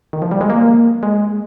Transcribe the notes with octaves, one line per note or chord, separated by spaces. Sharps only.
D#3
F3
G3
G#3
A#3
G#3